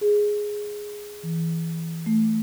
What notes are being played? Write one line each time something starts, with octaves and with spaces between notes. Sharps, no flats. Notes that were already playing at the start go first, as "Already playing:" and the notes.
G#4
E3
A3